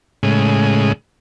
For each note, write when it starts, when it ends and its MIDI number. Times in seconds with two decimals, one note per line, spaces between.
0.23 0.93 45
0.23 0.93 49
0.23 0.93 56